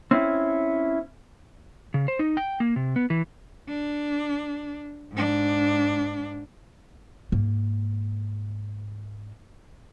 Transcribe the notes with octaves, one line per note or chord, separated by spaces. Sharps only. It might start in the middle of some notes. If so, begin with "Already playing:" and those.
C4 C#4 E4
C#3
C5
D#4
G5
A#3
C3
B3
E3
D4
G#2 D4
G#2 A#3